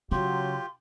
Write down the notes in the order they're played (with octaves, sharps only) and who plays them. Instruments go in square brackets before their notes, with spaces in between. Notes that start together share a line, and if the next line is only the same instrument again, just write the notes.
[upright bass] C#3 [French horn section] F#3 [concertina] F4 G4 [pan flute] C6